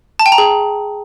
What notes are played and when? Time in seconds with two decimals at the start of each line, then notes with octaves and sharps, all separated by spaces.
0.19 A5
0.26 G5
0.32 A#5
0.38 G#4